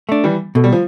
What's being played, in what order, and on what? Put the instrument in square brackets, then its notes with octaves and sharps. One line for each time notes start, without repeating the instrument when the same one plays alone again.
[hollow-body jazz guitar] A3 D4
[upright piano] E3 G3
[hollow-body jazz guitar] B2 [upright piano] A3
[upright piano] G3
F3